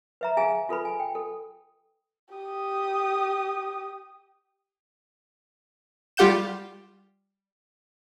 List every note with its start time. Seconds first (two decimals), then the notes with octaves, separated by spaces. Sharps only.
0.21 B4 E5 A#5
0.37 G#4 E5 F5 G#5 A#5
0.69 F4 A4 B4 B5
0.85 G#5
1.00 G5
1.15 A4
2.34 G4 D#6
6.17 G3 F4 G4 F#5 G6 E7